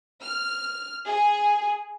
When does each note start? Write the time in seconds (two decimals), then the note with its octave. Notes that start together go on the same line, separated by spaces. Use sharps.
0.21 F6
1.07 G#4